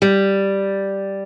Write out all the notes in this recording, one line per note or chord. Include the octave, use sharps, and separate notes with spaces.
G3